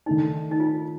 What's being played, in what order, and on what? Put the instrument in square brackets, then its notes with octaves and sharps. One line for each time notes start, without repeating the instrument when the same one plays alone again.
[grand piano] D#3 A3 D4 [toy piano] D#4
[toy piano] D#4
F4